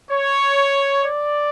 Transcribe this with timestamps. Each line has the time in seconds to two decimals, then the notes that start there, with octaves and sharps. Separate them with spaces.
0.11 C#5
1.02 D5